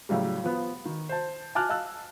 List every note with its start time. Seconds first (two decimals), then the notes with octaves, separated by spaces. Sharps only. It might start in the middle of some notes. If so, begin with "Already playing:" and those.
0.09 A2 C#3 F#3 G3
0.44 F3 B3
0.85 D#3
1.09 C5 A5
1.55 G#5 A5 D6 F6 F#6
1.69 D#5 F5 A5 E6 F#6